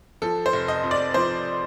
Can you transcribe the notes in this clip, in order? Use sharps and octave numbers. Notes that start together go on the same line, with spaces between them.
F3 A4
C5
F1
D#5
F2
D5
F3 C5